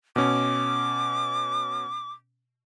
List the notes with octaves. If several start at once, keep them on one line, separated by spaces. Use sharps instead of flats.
B2 C#4 D6